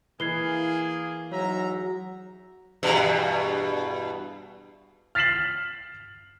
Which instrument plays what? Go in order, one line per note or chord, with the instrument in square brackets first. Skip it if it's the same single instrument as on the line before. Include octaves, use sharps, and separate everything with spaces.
[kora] E3 [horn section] A#3 G#4 [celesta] G#6 C7 G7
[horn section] G#2 E5 A#5 [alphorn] F#3 [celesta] C#5
[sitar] E2 G2 B2
[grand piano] F6 A6 B6 C7 E7 F#7